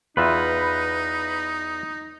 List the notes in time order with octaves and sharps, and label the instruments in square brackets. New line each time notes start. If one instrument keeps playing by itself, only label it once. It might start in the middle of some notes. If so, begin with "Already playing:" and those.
[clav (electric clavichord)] E2 F4 E5 [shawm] D#4 [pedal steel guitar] B4